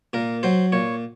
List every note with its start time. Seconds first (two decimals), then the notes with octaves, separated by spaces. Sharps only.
0.13 A#2 A#4
0.43 F#3 C5
0.72 A#2 C#5